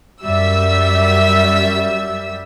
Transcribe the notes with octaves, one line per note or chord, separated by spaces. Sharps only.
F#2 G3 E5 E6